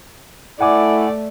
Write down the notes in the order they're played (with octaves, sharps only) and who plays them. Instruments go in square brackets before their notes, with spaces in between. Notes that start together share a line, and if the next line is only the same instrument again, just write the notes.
[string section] A3 [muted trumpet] E4 [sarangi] D5 [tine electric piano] F#5 G#5 D6